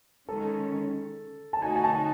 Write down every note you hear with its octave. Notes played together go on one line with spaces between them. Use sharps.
D#3 G#3 C#4 A4
A5
A3 D#4 F#4 G#5
G#5
A5